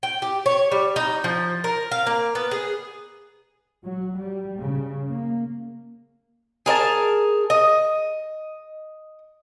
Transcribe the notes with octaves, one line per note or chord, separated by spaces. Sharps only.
G5
G4
C#5
G3
D#4
F3
A#4
F5
A#3
B3
G#4
F#3
G3
C#3
A#3
G#4 A#4 D#5 A5
D#5